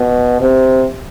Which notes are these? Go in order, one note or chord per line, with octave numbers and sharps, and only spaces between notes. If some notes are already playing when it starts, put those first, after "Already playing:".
Already playing: B2
C3